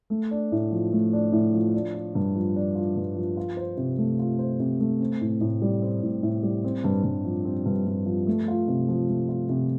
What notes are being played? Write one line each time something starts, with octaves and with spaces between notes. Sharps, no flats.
A3
D4
A2
F3
A3
D4
A2
F3
D4
F4
G2
F3
D4
F4
G2
F3
F4
C5
C3
A3
F4
C5
C3
A3
C4
A2
A2
G3
C4
A2
A2
G3
C4
G2
G2
F3
C4
G2
G2
F3
A3
F4
C3
F3
A3
F4
C3